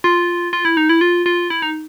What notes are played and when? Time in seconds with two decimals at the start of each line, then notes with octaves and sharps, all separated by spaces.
0.04 F4
0.53 F4
0.65 E4
0.77 D#4
0.89 E4
1.01 F4
1.26 F4
1.50 E4
1.62 D#4